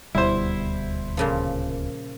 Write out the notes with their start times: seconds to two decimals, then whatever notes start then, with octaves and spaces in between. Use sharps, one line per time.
0.15 D#1 D2 B2 G3 E4 C5
1.17 A#2 C#3 F3